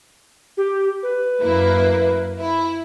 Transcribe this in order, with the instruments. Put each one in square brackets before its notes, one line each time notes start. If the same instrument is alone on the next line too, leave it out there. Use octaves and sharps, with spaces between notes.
[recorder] G4
B4
[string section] F#2 A#3 E4
E4